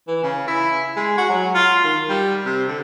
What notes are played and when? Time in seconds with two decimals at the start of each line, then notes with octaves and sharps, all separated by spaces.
0.07 E3
0.23 C#3
0.47 E4
0.96 G#3
1.18 F#4
1.30 F#3
1.55 F4
1.84 D#3
2.09 G3
2.45 C3
2.68 D3